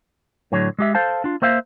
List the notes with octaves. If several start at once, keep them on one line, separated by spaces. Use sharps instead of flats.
A2 D3 F#3 C#5
G#3 G4 E5
A4 C5 F5 A5
D4 F4
A#3 C5 E5 F5